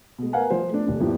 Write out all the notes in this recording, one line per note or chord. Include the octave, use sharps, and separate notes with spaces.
B2 G#3
A#4 B4 F5 F#5 G#5
F3 C5
A3 B3 D4
D#1 D4
G2 F3 A#3 B3 E4 G4